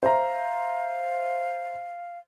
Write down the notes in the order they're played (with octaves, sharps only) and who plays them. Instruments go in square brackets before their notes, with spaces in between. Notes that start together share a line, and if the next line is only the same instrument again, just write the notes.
[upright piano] C5 E5 A#5 [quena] F5